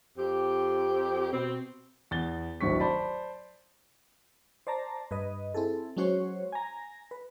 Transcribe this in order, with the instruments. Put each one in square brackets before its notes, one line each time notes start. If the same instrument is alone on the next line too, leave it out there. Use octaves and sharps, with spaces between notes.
[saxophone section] F2 C4 G4
B2 C4
[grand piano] E2 A6 G7
D1 G#1 G2 C#6 B6
C5 D5 A5 B5
[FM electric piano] C5 D5 A5 A#5
G2 B4 D#5
C4 E4 G#4 A4
F#3 G#3 C#4 F#4 C5 C#5
G#5 A#5
B4